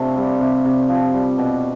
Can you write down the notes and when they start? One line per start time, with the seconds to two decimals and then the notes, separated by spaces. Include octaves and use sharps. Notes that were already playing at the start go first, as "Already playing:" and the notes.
Already playing: C3 A3 C4 D4 F4 A4
0.16 G3
0.40 C3
0.65 C3
0.89 F3
1.14 G3
1.38 B2